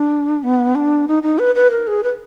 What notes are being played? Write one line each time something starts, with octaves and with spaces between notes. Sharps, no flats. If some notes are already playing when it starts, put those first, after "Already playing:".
Already playing: D4
B3
D4
D#4
D#4
B4
B4
A#4
G#4
B4